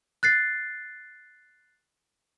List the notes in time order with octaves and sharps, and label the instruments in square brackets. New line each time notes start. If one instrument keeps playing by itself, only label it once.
[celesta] F#6 A6 C7